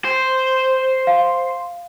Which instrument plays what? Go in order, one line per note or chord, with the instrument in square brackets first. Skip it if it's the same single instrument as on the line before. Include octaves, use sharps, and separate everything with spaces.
[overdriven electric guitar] C5
[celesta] F5